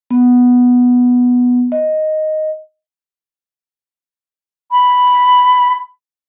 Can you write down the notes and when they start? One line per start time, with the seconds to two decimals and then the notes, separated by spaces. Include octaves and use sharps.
0.11 B3
1.72 D#5
4.72 B5